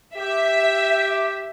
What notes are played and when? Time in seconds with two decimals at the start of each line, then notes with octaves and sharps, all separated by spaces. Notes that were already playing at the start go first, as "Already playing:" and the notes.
0.16 G4 E5